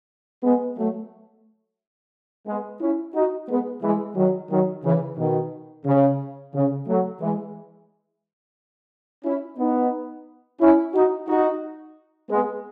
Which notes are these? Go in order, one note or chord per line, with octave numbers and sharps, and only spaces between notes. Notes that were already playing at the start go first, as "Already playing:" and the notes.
G#3 B3
F#3 A3
G#3 B3
C#4 E4
D#4 F#4
G#3 B3
E3 G#3
D#3 F#3
D#3 F#3
C#3 E3
B2 D#3
C#3
C#3
F#3 A3
E3 G#3
C#4 E4
B3 D#4
C#4 E4
D#4 F#4
D#4 F#4
G#3 B3